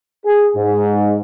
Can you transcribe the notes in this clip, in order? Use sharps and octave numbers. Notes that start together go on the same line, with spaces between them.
G#4
G#2